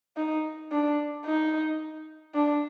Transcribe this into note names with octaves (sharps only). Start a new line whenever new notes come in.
D#4
D4
D#4
D4